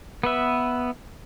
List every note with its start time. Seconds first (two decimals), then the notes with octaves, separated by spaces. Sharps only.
0.24 B3 B4 E5